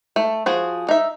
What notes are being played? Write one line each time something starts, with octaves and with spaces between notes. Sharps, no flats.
A3
F3 F#4 G#4
D#4 E5